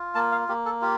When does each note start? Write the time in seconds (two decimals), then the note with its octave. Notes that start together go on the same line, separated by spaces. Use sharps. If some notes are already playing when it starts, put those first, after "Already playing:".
Already playing: F4
0.15 A#3 A5
0.32 F5
0.49 A#3 G4
0.65 A4
0.82 F4 G4